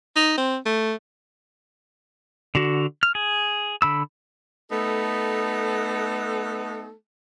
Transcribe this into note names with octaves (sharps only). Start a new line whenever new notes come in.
D#4
C4
A3
D3 F#4
F6
G#4
D3 B5 E6
A3 B3 D#4 A4